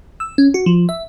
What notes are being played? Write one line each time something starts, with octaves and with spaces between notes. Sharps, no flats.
E6
C#4
F#4
F3
E5